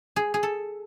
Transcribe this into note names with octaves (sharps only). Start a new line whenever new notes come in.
G#4
G#4
A4